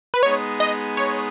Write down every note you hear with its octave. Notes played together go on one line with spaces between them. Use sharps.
B4
G#3 B3 D#4 G#4 C#5
D#5
C#5